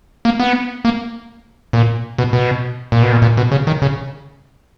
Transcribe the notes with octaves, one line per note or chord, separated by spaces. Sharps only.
A#3
B3
A#3
A#2
B2
B2
A#2
B2
A#2
A#2
B2
C#3
D#3
C#3